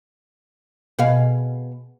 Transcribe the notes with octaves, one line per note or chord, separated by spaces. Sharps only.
B2 G#4 F5